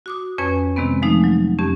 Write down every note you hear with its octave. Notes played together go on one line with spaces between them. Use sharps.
F#4 D6 D#6
F2 C#4 B4 C#5 G#5
C3 D#3 G#3 B3 C4
F3 G#3 A3 D#4
F#3
F2 C#4 G4